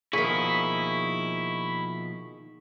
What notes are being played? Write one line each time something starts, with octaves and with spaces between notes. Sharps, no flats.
B2 D#3 F3 A#3 E4 G#4 C#6 B6